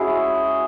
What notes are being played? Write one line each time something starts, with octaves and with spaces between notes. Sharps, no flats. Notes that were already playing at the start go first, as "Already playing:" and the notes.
Already playing: G#3 C#4 E4 F#4 G#4